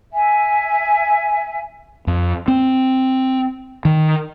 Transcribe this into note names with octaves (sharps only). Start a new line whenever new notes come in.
E5 G#5
F2
C4
D#3